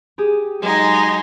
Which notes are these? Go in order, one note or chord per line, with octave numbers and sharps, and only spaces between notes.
G4 G#4
F#3 G#3 D#4